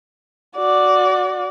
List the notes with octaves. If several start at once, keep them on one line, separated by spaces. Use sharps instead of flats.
F#4 D5